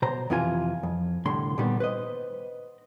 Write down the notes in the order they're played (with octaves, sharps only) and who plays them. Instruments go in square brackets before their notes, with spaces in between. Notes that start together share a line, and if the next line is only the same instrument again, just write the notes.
[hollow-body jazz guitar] B2 C5 A#5
F2 C3 E3 F4 C5 G#5
F2
C2 A2 D3 C6
A#2 D3 D#3 G3 B3
B4 C5 D#5